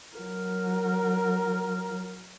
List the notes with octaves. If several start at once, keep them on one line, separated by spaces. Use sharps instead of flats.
F#3 A#4